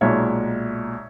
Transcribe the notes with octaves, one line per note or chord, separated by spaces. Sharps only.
B1 A#2 G#3 C#5 E5